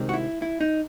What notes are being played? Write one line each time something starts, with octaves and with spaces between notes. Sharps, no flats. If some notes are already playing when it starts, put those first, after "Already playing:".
Already playing: C2 C3 D#3 G#3 C4
F#4
E4
E4
D#4